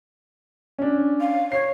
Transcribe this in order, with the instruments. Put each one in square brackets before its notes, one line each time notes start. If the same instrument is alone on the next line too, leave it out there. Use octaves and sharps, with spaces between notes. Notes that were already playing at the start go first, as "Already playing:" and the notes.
[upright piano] C#4 D4
[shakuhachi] F5
[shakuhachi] C#5 [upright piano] C7